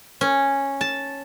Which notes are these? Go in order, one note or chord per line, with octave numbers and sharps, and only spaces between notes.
C#4
A5